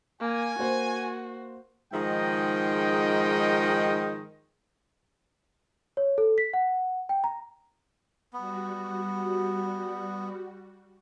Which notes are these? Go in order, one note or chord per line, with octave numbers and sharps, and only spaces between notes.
A#3 G#5
A#3 F#4 C5
G#2 D#3 F3 G#3 D#5 G5
C#5
A4
B6
F#5
G5
A#5
G3 B3 F#4